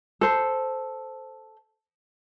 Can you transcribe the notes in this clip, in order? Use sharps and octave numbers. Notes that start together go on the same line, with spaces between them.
A4 C5